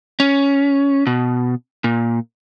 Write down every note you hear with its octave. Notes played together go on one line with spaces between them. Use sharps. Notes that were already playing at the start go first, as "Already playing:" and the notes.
C#4
B2
A#2